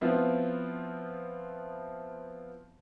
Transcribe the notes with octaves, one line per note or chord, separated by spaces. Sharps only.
F3 B3 C4 E4 F4